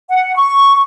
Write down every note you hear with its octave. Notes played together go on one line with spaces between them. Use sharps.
F#5
C#6